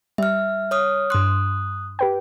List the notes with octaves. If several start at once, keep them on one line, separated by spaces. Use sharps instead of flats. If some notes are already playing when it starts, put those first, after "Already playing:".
G3 E5 F6
C#5 D#6 F6
G2 C6 D#6 F#6
G4 B4 G5